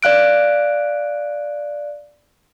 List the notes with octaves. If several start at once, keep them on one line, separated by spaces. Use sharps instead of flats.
D5 F5 F#6 D7